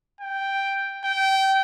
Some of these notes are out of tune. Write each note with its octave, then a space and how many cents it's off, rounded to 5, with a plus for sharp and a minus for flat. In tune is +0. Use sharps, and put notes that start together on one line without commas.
G5 +0
G5 -20